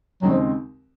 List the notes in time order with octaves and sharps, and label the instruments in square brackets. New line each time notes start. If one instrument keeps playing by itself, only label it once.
[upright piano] D#2 C#3 G#3 C4 [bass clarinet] F#3
[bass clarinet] F3